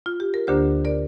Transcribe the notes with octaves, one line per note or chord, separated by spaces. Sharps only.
F4
G4
A#4
D2 D3 A#3 D4 G4 C5
A#4 D5